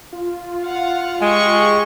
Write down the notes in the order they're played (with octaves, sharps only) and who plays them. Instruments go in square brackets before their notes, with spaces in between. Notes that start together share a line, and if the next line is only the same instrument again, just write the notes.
[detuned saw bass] F4
[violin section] F5 F#5
[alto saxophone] G#3 [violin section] G4 G#4 C#6